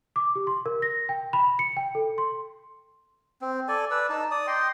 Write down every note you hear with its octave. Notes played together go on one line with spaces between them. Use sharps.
D6
G4
C6
A#4
A#6
G5
B5
C#7
G5
A4
C6
C4
A4 D5 G#5
B4 D5 E6
D#4 A5
D5 D#6
D#5 G5 C6